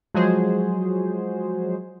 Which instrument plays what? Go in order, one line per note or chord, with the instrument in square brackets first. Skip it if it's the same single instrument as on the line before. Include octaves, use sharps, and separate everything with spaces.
[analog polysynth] F3 F#3 G#3 F#4 G#4 C5